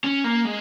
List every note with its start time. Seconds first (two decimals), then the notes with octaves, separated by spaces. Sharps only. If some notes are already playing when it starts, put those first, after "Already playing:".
0.04 C#4
0.24 A#3
0.45 G#3